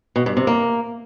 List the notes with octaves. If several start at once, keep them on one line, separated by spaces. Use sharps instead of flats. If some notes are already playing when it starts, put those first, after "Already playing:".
B2
G2
C3
A#3